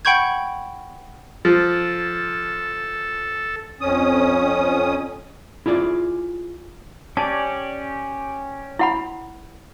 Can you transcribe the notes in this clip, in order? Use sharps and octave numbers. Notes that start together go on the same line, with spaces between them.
F#5 G5 B5 C#6 G6 G#6
F3 A4
F2 C#4 D#6
E4 F4 G#4 D5
C#4 G4 D5 A5
E4 F#5 B5